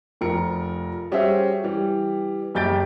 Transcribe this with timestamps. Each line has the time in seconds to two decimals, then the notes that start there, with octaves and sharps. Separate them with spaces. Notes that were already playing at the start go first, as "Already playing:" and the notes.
0.21 F1 F3 A#4 C#7
1.12 G3 C#4 F#4 G#4 C5 E5
1.64 E3 G3
2.55 F#1 F#2 G4 G6 A6 D7